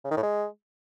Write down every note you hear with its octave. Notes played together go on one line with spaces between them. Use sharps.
C#3
D#3
A2
G#3